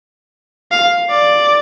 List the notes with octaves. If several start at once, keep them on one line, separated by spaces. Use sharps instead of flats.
F5
D5